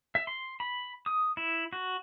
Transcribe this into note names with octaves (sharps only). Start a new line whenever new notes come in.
E5
C6
B5
D#6
E4
F#4